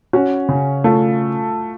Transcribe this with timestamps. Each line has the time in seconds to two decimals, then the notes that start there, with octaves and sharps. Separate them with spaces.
0.13 C#4 F#4
0.49 C#3
0.84 A3 F4